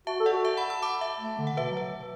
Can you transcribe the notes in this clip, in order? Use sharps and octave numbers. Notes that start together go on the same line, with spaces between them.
F#4 E5 A5
A4
D5 F#5
F#4
E5 A5
F#5 B5
B5 E6
A5 D6
E5 A5
A3
D3
F#5
D3
B2 B4 E5
F#3
B4